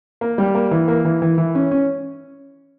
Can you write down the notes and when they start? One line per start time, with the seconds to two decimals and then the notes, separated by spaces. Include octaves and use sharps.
0.21 A#3
0.38 G3
0.55 A#3
0.71 E3
0.88 A#3
1.05 E3
1.22 E3
1.38 E3
1.55 C#4
1.71 C#4